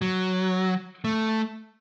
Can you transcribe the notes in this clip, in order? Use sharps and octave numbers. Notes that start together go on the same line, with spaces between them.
F#3
A3